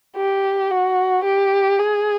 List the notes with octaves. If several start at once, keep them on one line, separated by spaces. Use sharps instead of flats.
G4
F#4
G4
G#4